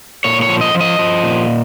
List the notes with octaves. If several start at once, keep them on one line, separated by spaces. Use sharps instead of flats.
A#2 C#5
C#5
F3
D#5
F3
D#5
F3
A#2